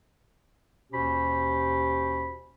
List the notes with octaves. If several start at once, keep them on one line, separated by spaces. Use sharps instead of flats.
D#2 B2 C#4 G4 C5 B5